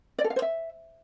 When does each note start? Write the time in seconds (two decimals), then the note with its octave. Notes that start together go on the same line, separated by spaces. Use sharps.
0.19 D5
0.24 A4
0.30 F5
0.36 C5
0.42 E5